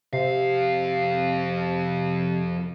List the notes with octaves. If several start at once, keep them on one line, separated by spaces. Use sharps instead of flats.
F2 C3 F5